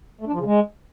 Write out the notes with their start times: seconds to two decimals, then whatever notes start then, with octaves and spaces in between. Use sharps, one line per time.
0.21 A3
0.27 D4
0.34 F3
0.40 C#3
0.46 G#3